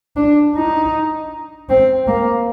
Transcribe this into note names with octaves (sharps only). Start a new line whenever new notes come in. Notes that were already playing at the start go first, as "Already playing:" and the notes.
D4
D#4
C4
A#3